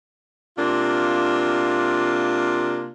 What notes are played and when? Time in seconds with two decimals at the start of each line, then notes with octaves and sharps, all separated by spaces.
0.57 C3 A#3 D4 F4